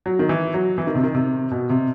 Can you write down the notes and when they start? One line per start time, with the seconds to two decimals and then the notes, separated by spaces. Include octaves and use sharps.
0.06 F#3
0.19 D#3
0.29 E3
0.54 F#3
0.78 E3
0.87 D#3
0.95 C3
1.04 D#3
1.15 C3
1.51 B2
1.70 C3